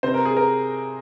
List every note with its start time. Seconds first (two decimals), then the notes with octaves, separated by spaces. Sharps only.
0.03 C3 C5
0.14 A#4
0.25 G#4
0.37 A#4